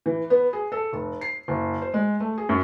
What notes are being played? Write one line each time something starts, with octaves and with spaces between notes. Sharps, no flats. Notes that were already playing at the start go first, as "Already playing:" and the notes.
E3
B3
G#4
A4
F1
C7
F#1
C5
G#3
A3
G#4
F#2